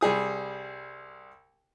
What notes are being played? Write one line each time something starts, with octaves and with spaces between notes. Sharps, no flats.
C2 G3 G#4 D#6